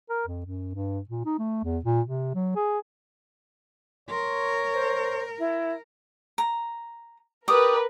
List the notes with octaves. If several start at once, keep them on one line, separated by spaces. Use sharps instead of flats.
A#4
F2
F#2
G2
A#2
D#4
A3
E2
A#2
C3
F#3
G#4
A#4 C#5 C6
C5
E4
A#5
G4 A#4 B4 D5 D#6